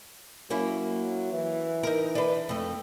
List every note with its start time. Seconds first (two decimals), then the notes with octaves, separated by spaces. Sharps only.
0.50 F#3 A#3 C#4 E4
1.33 E3
1.83 D#4 A#4
2.15 D4 B4
2.49 F2 A3